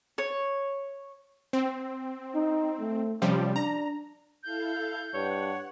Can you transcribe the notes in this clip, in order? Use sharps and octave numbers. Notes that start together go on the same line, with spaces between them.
C#5
C4
D#4
A3
C3 F3 G3 C#4
D4 A#5
E4 A4 F5 G6
G2 C#5 F#5